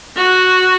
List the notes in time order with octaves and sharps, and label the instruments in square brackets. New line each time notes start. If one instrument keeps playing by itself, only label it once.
[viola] F#4